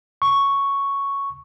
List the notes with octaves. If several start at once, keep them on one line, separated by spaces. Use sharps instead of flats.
C#6